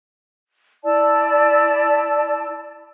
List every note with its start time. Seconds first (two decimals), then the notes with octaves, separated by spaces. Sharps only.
0.84 E4 D5 A5 E6